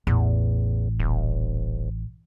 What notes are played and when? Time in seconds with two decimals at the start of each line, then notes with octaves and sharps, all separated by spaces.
0.07 A1 E2
1.00 D#1